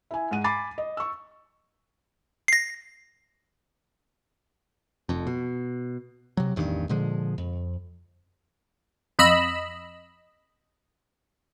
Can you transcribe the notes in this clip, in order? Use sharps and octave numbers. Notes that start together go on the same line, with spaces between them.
E4 G#5
G#2 G#3 F#5 D#7
G#5 B5 D6 A6 C7
D#5
C#6 E6
A#6 C7
F1 F2
B2
C3 F#3
A1 E2 G2 D#3
A#2 D3 F3 G#3
F2
F2 D#5 B5 E6